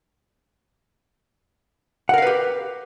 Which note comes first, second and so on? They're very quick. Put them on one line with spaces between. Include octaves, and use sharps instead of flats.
F#5 A#4 F5 B4 G4